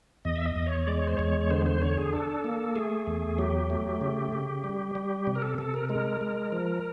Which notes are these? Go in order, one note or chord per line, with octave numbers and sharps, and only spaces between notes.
E2 D#5
E5
D#5
E2
C#5
G#3 D5
C#5
C5
E2 C#5
C#5
D3 C5
C5
D3 C#5
G#4
D4 A4
A#3
A3 G#4
E2
F#3 G4
A3
C#3
C#3
G3
G3
C3
A#4
A4
C3 A4
A#4
G#3 A#4
G#3
F3